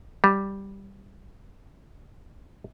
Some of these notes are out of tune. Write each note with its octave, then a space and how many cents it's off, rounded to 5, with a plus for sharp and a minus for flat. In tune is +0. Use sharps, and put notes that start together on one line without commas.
G3 +0